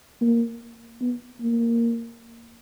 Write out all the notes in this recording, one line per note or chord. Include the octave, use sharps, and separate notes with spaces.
A#3
B3
A#3